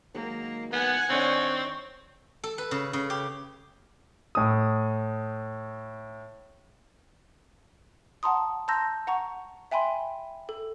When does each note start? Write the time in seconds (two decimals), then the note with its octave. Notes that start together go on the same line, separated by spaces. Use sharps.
0.14 D#3 F#3 G#3 A#3
0.73 B3 F#5 G#5
1.10 D#3 C4 D4 C#5 D#5
2.44 A4
2.58 B4
2.71 C#3
2.93 C#3
3.10 G4
4.35 A2 D#6
8.23 F#5 A5 A#5 C6 D#6
8.68 A5 A#5 C6 E6 G6 A#6
9.07 F#5 A#5 C#6
9.71 E5 G5 G#5 B5 C6
10.49 A4